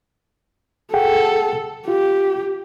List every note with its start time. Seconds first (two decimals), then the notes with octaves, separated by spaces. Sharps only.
0.94 G#4 A4 F#5 G5
1.88 F4 G4